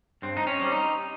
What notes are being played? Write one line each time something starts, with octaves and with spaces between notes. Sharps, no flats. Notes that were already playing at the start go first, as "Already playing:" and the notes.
G2 C4
D#4
C#4
G3 C4
D#4